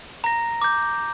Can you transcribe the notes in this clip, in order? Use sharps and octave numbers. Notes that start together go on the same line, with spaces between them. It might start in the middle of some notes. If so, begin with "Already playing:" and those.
A#5 A#6
D6 G6